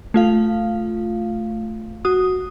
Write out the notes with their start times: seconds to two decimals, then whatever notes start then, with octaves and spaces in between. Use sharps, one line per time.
0.14 A3 F4 F5
2.05 F#4 D#6